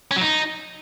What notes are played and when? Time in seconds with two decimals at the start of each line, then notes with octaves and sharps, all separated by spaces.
0.11 C#4
0.16 F#3
0.21 D#4